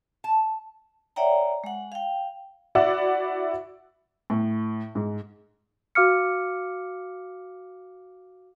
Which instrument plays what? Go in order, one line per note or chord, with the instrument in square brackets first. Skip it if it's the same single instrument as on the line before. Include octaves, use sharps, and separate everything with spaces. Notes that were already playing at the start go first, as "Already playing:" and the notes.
[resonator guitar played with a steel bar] A5
[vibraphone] C#5 D5 E5 F#5 G5 A#5
G#3 F#5
F5 G5
[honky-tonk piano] E4 F#4 D5 E5 F#5
[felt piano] A2
G#2
[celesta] F#4 F5 D6 F6 C#7